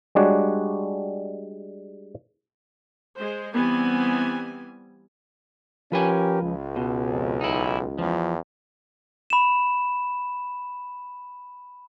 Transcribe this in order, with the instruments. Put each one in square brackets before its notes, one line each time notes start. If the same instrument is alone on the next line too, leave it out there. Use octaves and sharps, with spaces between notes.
[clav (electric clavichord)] G3 G#3 D4 F#4 C#5
[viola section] G#3 C5
E3 G3 B3 C4 G#5
[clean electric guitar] F3 B4 G#5 [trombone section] C#4 G4 A#4
[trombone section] C#2
[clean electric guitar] B2
[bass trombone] F2
[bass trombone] B1 [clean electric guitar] D#4 E4
[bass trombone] E2 [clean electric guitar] F3
[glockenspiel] B5 E7